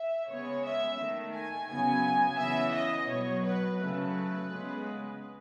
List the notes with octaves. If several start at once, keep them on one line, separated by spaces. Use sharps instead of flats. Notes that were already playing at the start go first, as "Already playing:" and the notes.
Already playing: E5
C#3 G#3 B3 C#5
E5
D#3 A3
G#5
C#3 F#3 B3 G#5
C#3 E3 B3 E5
D#5
B2 F#3 B3 C#5
B4
C#3 F#3 A3 B4
C#3 G#3 B3